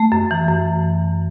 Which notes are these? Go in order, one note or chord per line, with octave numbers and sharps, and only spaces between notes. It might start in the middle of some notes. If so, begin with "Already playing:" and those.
Already playing: A3
F#2
E3
F#2